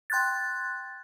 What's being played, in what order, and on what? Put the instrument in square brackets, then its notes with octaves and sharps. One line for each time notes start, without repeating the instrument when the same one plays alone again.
[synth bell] G5 C6 F#6 G#6 A6